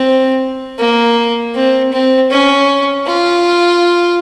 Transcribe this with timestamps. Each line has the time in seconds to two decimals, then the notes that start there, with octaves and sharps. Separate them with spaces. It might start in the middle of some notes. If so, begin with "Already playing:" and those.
Already playing: C4
0.79 A#3
1.55 C4
1.92 C4
2.30 C#4
3.07 F4